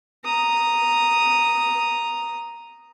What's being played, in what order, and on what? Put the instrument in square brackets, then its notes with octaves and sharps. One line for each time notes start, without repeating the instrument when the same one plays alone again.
[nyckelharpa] A#5 D#6